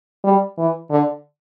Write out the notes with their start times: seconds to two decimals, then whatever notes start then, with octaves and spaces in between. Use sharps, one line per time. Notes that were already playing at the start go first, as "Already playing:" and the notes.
0.24 G3
0.58 E3
0.91 D3